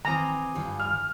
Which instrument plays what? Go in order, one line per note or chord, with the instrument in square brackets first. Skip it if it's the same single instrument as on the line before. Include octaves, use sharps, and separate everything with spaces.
[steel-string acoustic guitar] D#3 E3 C4 [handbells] G#5 D6 D#6 [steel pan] A#5
[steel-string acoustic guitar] G2 D3 F3
[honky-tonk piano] F6